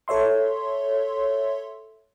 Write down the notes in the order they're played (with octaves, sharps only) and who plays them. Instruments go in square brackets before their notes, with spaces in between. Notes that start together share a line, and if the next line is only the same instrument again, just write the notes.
[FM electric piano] A4 C#5 E5 C6